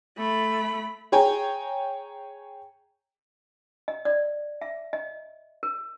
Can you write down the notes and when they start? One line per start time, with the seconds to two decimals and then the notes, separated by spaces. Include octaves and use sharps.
0.17 A3 B5
1.12 G#4 C#5 G5 G#5 A#5
3.88 D#5
4.05 D5
4.62 E5
4.93 D#5
5.63 A#4